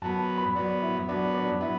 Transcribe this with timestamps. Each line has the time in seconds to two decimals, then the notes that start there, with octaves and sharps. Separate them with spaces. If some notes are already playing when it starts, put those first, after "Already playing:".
0.02 F#2 F#3 B3 A5
0.38 B5
0.55 F#2 F#3 B3 D5
0.82 E4
1.08 F#2 F#3 B3 D4
1.34 D4
1.61 F#3 B3 E4